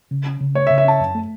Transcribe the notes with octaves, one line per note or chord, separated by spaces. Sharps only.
C#3
C#4
C#3
A3 C#5
E5
C#3
E5
C#4 A5
F#2
A3